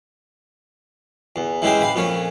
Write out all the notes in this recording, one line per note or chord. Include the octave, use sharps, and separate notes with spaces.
E2
E3 G#3 C#4 G4 C5
B4 F5
F2 A#2 C#4 C#5